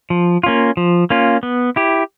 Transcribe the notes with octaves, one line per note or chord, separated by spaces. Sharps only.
F3
A#3 C#4 F4
F3
A#3 C#4 F4
B3
E4 G4